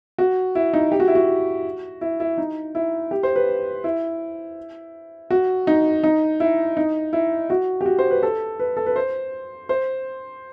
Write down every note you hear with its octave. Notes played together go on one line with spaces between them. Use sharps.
F#4
E4
D#4
G4
F#4
E4
F#4
E4
E4
D#4
E4
G4
C5
B4
E4
F#4
D#4
D#4
E4
D#4
E4
F#4
G4
F#4
C5
B4
A4
B4
A4
B4
C5
C5